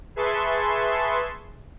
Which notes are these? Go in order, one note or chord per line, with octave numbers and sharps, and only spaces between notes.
G#4 B4 E5 A5 C6 C#6